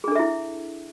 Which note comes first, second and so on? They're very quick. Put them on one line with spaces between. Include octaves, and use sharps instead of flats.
G#4 D4 A4 E5 E4